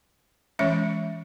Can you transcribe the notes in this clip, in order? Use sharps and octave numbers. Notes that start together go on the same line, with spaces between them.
E3 G#3 C#4 E5